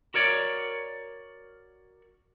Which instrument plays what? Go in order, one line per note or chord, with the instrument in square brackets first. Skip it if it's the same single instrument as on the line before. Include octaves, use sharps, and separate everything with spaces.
[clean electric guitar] F#4 A#4 C#5 D5